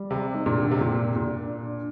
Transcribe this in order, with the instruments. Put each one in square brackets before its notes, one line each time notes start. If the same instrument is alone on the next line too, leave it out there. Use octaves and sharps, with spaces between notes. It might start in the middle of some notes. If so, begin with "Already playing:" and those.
Already playing: [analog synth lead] G3
[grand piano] C3
[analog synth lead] D#4
[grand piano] A#2 [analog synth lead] D4
[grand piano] D3
C3
A#2
A#2